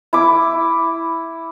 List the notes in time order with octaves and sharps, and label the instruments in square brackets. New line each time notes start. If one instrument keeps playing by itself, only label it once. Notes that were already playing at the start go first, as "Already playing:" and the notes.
[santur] E4 D6